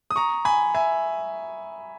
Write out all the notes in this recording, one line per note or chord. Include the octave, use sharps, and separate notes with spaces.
D#6
A#5 C#6
G#5 B5
E5 G#5